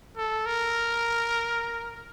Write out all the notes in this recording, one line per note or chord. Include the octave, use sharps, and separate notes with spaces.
A4
A#4